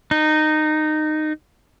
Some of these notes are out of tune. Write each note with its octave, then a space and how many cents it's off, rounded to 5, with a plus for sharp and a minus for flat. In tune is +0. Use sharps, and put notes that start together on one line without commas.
D#4 -15